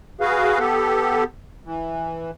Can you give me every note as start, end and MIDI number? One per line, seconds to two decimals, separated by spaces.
0.21 0.59 66
0.21 0.59 68
0.21 0.59 71
0.21 0.59 77
0.59 1.24 59
0.59 1.24 67
0.59 1.24 69
1.65 2.31 52